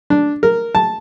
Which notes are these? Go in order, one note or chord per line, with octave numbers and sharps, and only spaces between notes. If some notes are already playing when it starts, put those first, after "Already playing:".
D4
A#4
A5